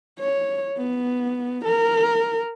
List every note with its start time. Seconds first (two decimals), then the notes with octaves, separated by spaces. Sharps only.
0.19 C#5
0.78 B3
1.65 A#4